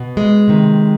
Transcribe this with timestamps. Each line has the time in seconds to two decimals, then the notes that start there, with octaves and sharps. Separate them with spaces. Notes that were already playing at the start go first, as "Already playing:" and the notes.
Already playing: B2
0.17 G#3
0.48 C3 D#3